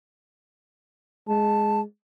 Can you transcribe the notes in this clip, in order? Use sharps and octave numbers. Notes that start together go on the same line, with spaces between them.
G#3 A5